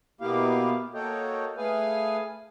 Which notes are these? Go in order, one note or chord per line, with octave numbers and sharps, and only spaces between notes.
B2 A#3 B3 E4 G4 F5
A#3 F#4 A4 C#5 D#5 G5
A3 G#4 B4 F5 G#5